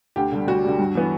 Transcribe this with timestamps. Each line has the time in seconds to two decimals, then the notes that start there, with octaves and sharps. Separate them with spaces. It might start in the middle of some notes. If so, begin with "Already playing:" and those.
0.16 D2 G4
0.32 D3 G3
0.47 D2 F#4
0.64 D3 G3
0.79 G2
0.95 E3 B3